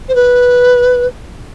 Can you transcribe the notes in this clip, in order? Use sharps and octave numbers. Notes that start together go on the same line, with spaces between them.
C5
B4